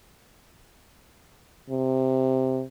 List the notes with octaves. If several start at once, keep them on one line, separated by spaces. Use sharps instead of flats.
C3